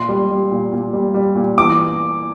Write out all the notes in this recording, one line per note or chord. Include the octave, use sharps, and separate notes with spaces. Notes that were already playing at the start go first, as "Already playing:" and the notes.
Already playing: A#2 C6
G3
G3
A#2
A#2
G3
G3
A#2
E3 D6